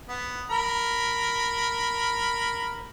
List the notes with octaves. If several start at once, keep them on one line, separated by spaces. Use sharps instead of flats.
B3
A#4 B5